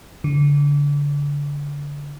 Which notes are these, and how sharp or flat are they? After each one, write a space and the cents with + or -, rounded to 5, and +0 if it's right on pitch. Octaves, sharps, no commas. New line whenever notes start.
D3 -30